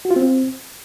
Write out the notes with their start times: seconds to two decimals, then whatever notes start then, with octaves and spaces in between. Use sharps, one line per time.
0.05 F#4
0.11 F4
0.16 C4